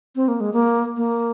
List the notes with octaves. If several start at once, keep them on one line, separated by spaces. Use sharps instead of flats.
C4
A#3
G#3
A#3
A#3